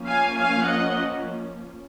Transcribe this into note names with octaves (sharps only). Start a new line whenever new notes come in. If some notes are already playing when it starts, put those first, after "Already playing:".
Already playing: F3 A#3 C#4
F5 G#5
F5 G#5
D#5 F#5